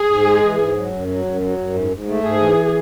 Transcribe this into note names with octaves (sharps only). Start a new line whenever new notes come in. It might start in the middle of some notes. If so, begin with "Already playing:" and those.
Already playing: G#4
G#2
G#3
E3
G#2
F#3
F#2
F#3
F#2
F#3
F#2
G#2
G#2
A3
G#2 G#4
E3